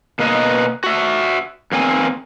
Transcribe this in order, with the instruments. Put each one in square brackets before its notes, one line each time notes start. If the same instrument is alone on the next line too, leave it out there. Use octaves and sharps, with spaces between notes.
[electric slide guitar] B2 A#3 B4 D#5
F#4 E5
E2 A#3 C4 G#5